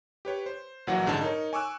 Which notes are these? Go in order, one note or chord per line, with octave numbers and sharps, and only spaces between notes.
G4 B4 C#5
C5
A#1 A#2 E3 F#3 F#5
A1 G#2 D3 D4 C5 A5
D#4 A#4 C#5
G#5 C#6 D6 E6 F#6